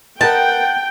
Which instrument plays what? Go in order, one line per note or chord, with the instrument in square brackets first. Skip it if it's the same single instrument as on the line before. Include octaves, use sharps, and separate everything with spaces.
[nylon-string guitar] A#4 B4 D#5 [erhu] F#5 [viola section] G5 [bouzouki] A5